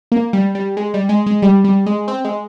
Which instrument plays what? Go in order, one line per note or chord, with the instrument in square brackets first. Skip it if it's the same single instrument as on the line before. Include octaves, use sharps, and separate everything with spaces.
[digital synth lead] A#3
G3
G3
G#3
G3
G#3
G#3
G3
G3
G#3
C4
G#3